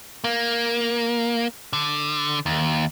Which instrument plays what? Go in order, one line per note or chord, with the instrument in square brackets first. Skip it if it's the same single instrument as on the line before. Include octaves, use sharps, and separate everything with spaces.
[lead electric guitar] A#3
D3
D#2